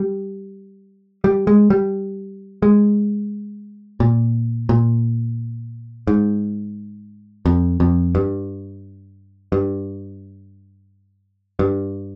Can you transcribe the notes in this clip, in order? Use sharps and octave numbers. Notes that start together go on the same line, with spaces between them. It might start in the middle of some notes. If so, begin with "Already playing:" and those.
Already playing: G3
G3
G#3
G3
G#3
A#2
A#2
G#2
F2
F2
G2
G2
G2